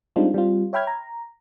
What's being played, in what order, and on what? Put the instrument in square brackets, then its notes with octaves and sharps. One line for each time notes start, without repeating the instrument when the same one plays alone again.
[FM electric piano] G3 G#3 C4 D4 D#4 F4
G3 C4 F4
C#5 E5 G5 B5 F6 G#6
A#5